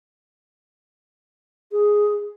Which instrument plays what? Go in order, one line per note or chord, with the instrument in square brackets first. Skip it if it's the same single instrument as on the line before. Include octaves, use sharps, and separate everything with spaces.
[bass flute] G#4